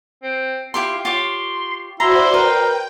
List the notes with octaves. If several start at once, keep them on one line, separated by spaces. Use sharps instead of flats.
C4
E4 F4 G4 C6
F4 G4 C#5 C6
E4 F#4 C5 D5 A#5 C6
A#4 B4 G5